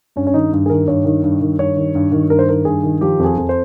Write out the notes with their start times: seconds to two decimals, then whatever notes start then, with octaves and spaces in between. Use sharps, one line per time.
0.16 G2 C#4
0.27 C#4
0.34 D#3 D#4
0.53 G2
0.66 G#4
0.70 D#3 A#4
0.88 G2 C#5
1.05 D#3
1.23 G2
1.41 D#3
1.59 G2 C#5
1.77 D#3
1.95 G2
2.12 D#3
2.30 G2 A#4
2.39 C5
2.48 D#3 A#4
2.65 G2 G#4
2.83 D#3
3.01 F3 G4
3.19 F2
3.24 G#4
3.37 F2
3.49 C5